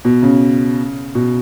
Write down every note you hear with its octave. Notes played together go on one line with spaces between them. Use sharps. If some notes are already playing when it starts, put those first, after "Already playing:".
B2
C#3
B2